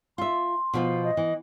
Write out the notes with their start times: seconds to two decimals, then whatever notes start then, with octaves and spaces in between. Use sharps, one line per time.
0.18 F4 E5 C6
0.74 B2 F3 F4
1.04 D#5
1.17 E3